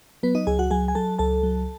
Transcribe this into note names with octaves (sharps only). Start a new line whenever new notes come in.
F#3 B3 B4
D#4 D#5
C#2 G#4 G#5
F#4 F#5
F#3 G#4 G#5
G#5
F#3 A4 A5
C#2 A4 A5
F#3